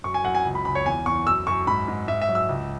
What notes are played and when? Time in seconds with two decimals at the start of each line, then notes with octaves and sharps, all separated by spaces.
0.04 F#2 C#6
0.14 G#5
0.24 F#2 F#5
0.35 G#5
0.45 C#2
0.55 B5
0.65 C#2 B5
0.75 C#5
0.86 E2 G#5
1.06 E2 C#6
1.26 F#2 E6
1.47 F#2 C#6
1.67 G#2 B5
1.88 G#2
2.08 G#2 E5
2.21 E5
2.29 F#3
2.35 E6
2.49 C#2